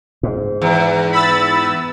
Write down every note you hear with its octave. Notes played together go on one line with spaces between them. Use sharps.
G#2
E2
B5 E6 A6